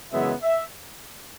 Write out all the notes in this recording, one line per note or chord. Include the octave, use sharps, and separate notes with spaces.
F#2 C#3 E3 G#3 B3 E5
E5